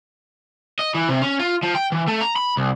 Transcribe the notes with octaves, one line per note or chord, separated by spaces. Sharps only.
D#5
E3
C3
C#4
F4
F3
G5
E3
A3
A#5
B5
C2